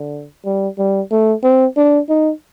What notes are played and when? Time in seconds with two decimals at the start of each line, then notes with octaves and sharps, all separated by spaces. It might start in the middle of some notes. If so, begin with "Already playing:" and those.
Already playing: D3
0.45 G3
0.78 G3
1.11 A3
1.43 C4
1.77 D4
2.09 D#4